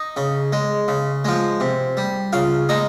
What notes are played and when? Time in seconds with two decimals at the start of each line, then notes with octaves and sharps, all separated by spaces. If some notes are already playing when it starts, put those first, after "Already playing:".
Already playing: D#4 D#5
0.17 C#3
0.53 G#3
0.88 C#3
1.25 F3 G#3
1.60 C3
1.97 G3
2.33 C#3 F4 F5
2.69 G#3 D#4 D#5